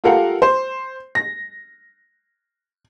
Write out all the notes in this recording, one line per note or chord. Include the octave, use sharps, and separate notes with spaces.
F4 G4 A4 A#4 F5 F#5
C5
A#6